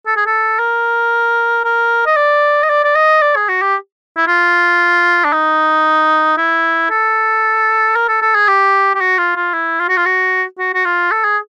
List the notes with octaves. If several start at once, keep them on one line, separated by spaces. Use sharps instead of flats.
A4
G#4
A4
A#4
A#4
D#5
D5
D#5
D5
D5
D#5
D5
G#4
F#4
G4
E4
F4
D4
D#4
E4
A4
A#4
A4
A4
G#4
G4
G4
F#4
F4
F4
E4
F4
F#4
F4
F#4
F#4
F#4
F4
A4
G#4